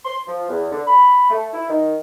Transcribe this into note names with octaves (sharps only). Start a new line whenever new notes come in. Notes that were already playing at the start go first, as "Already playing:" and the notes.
C6
F3
E2
D3
B5
A3
E4
D#3